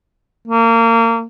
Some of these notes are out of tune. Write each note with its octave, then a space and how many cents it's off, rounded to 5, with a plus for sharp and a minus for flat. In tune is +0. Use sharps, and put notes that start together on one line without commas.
A#3 -30